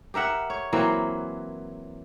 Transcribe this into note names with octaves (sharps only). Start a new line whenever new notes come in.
G4 A#4 E5 F#5
C#5
E3 F#3 A#3 C4